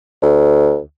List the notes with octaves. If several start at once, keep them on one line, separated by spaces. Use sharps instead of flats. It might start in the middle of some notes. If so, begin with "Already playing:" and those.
D2